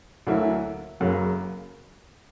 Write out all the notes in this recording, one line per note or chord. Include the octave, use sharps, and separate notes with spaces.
D2 D3 F#3 A#3 E4
F#1 F#2 C#3 F#3 A#3